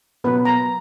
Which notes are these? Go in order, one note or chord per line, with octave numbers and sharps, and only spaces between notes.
B2 F#3 B3 B4
A#5